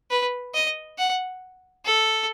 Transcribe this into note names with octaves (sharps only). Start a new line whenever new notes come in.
B4
D#5
F#5
A4